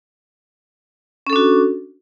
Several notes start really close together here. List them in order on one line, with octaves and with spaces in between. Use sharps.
C#4 A4 D4 F#4